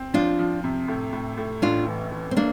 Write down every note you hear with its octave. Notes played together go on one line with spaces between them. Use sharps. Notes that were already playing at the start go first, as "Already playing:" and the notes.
Already playing: C4
F3 D4 F4
F3
C3
A2
A2
A2
A1 D4 F4
E3
E3
C4
A#3 D4